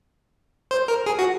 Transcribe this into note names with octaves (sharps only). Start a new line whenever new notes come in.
C5
A#4
G#4
F#4